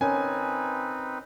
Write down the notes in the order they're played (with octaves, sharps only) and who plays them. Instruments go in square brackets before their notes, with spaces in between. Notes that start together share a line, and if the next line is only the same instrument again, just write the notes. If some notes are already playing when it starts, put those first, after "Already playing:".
[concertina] C4 D#4 B4 [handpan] C#4 A#4 C#5 [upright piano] G#5